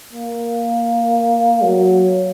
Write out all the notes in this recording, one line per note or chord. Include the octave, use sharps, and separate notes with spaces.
A#3
F#3